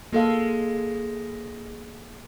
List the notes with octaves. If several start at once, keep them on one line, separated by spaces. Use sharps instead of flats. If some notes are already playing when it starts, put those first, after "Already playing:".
G#3 A#3 A4 F5